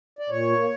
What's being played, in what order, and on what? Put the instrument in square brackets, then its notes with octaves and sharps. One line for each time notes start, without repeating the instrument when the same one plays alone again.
[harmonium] D5
A#2 C#5
A#3